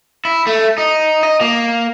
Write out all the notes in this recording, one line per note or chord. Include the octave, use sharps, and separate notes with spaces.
E4
A3
D#4
D#5
A#3